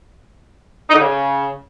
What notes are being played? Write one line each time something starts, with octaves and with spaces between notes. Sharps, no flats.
D#4
D3
C#3